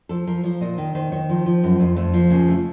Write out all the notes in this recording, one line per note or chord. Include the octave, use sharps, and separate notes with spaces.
F3 A4
F3 A#4
F3 C#5
A#2 D#5
D#3
D#3 C5
D#3 C#5
F3 D#4
F3
F#2
F2 A#3
F2 A3
F3 A#3
C#3 A#3
A3